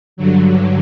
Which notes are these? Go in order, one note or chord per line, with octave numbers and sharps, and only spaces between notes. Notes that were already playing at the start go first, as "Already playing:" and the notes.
G2 D3 F#3